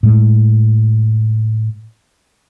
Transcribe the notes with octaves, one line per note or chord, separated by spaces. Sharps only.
A2 G#3